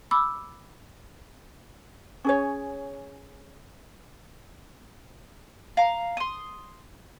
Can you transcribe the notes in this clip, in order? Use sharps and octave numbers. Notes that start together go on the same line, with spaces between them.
B5 D6 E6
C#4 G#4 C#5
F5 A#5
C6 D#6